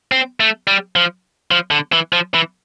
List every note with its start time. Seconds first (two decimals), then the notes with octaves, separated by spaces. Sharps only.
0.12 C4
0.40 A3
0.67 G3
0.96 F3
1.51 F3
1.71 D3
1.92 E3
2.13 F3
2.34 E3